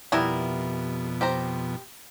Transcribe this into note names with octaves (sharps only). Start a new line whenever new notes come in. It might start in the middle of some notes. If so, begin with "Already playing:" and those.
F2 B2 G3 B3 E4 A#4
G4 C5 A#5